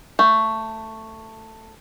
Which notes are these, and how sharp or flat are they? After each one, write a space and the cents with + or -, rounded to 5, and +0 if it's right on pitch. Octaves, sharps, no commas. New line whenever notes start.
A3 +10